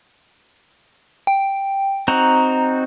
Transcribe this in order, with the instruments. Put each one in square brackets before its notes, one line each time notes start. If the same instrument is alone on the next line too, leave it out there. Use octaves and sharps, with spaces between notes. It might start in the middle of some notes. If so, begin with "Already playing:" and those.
[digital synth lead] G5
[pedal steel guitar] C4 D#4 F#4 [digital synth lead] A#5